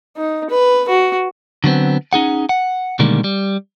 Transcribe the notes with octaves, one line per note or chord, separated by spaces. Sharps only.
D#4
B4
F#4
D3 F#3 B3 C4
C#4 D#4 G#4 F#5
F#5
B2 D3 D#3 G3 G#3 A#3
G3